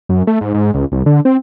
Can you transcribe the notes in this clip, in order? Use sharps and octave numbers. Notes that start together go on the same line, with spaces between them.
F#2
A3
G#2
G#2
C#2
C2
D3
C4